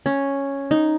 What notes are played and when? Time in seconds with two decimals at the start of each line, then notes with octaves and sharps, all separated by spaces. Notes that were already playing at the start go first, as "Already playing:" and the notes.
0.06 C#4
0.71 D#4